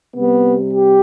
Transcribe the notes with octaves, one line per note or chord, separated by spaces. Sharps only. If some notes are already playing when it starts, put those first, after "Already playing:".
C3 G3 B3
G4